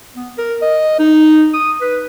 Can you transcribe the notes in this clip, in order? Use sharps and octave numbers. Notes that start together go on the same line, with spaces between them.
B3
A#4
D#5
D#4
D#6
B4